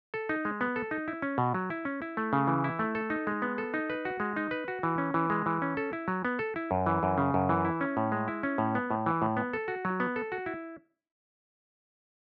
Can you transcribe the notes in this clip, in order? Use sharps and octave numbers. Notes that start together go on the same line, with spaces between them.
A4
D#4
G#3
B3
A4
D#4
E4
C#4
B2
F#3
E4
C#4
E4
A3
C#3
E3
E4
A3
A4
D#4
G#3
B3
A4
D#4
B4
F#4
G#3
D#4
B4
F#4
E3
C#4
E3
G#3
E3
C#4
A4
E4
F#3
B3
A4
E4
F#2
E3
F#2
C#3
F#2
E3
E4
C#4
A2
G#3
E4
C#4
A2
B3
A2
E3
A2
B3
A4
F#4
F#3
B3
A4
F#4
E4